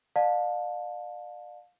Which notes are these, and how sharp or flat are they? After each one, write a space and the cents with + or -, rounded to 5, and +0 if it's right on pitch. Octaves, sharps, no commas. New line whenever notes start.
D5 +40 F5 +30 A5 +0